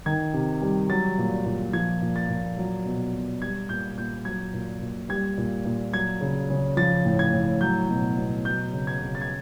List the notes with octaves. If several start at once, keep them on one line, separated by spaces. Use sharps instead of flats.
D#3 G#6
C3
G3
F#3 A6
A#2
A#2
F3 G#6
A#2
A6
A#2
F#3
B2
B2
G3 G#6
A#2 G6
A#2 G6
F#3 G#6
A#2
A#2
G3 G#6
A#2
A#2
F#3 G#6
C#3
C#3
F3 A6
A2
G#6
A2
F#3 G6
B2
B2
F#3 G6
C#3
G#6
C#3
A6
G#6